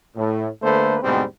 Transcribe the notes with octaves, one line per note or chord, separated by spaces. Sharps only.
A2
D3 A3 A#3 B4 C5
D2 G#2 B2 G3 C4